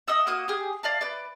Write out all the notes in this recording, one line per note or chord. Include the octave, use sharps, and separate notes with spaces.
D#5 F#5 D#6 E6
A#3 F#4 D#6
G4 G#4
D5 F5 A5
B4 D5